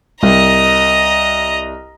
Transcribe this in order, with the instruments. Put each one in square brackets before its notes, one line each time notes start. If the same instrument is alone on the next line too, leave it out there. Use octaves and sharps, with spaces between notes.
[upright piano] C2 [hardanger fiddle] D#5 A#5